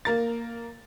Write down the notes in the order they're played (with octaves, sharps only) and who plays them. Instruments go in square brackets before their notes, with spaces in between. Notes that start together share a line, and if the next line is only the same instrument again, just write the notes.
[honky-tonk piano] A#3 A#4 A6